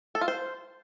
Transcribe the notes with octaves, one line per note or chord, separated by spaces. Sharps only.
A4
F4
C5